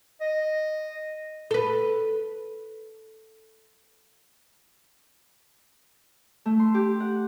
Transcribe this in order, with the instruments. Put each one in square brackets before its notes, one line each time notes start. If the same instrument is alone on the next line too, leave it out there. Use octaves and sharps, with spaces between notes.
[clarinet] D#5
[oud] A4 B4
[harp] A3
C6
G4
F#5